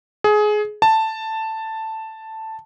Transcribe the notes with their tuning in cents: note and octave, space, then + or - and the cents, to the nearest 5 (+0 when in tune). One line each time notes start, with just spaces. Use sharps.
G#4 +20
A5 +5